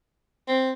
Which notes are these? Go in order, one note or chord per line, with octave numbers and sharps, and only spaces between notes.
C4